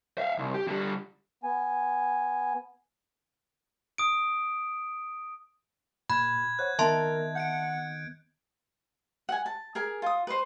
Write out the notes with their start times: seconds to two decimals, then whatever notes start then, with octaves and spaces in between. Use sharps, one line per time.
0.18 E5 F5
0.38 C2
0.54 G4
0.68 D3 G3
1.43 B3 G#5
3.98 D#6 D7
6.10 A#2 B5 F#6 G#6
6.59 C5 C#5 F#5 F#6
6.79 D#3 B3 A#4 D#5 E5 A5 C6
7.35 F#5 G6 C#7 D7
9.29 F#5 G#5
9.46 A5
9.75 G#4 A#4 G#5
10.02 F4 D#6
10.27 B4 C5